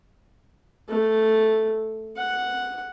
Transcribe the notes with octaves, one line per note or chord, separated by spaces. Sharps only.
A3
F#5